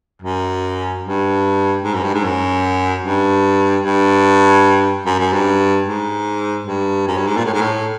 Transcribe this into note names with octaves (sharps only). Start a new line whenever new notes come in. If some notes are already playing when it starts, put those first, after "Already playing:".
F#2
G2
G#2
F#2
G2
G#2
F#2
G2
G2
F#2
F#2
G2
G#2
G2
F#2
G2
G#2
A#2
A2
G#2
A2